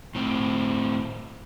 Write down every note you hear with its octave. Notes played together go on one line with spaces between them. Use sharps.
A2 C4